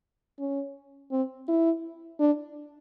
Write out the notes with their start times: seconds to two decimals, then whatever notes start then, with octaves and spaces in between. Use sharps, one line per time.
0.39 C#4
1.11 C4
1.48 E4
2.20 D4